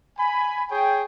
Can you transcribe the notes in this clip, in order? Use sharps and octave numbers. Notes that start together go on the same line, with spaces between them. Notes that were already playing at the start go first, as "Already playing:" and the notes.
G#5 B5
G#4 C#5 G5